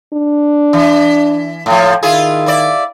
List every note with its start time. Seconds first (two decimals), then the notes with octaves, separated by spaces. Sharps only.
0.14 D4
0.73 E3
1.66 A2 F3
2.03 D#3 E4 F4 G#4
2.46 E4 D5